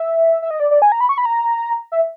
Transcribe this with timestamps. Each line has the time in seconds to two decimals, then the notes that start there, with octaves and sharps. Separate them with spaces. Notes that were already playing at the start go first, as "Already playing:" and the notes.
Already playing: E5
0.42 E5
0.51 D#5
0.60 D5
0.71 D5
0.82 G#5
0.92 A#5
1.01 B5
1.09 C#6
1.18 B5
1.26 A#5
1.92 E5